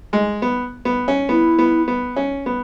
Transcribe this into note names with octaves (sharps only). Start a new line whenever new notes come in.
G#3
B3
B3
C#4
B3 E4
B3
B3
C#4
B3